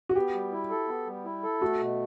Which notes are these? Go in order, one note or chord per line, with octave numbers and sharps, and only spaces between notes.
F#4
B3 G4
G3
E4
A4
B3
G3
E4
A4
A3 F#4
B2